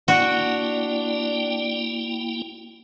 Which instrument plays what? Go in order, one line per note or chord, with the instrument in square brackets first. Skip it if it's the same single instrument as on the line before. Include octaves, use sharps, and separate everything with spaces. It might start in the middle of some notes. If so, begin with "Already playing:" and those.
[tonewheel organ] A#3 E4 G5 [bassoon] D4 [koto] F#4